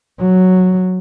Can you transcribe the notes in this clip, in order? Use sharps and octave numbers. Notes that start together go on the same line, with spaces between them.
F#3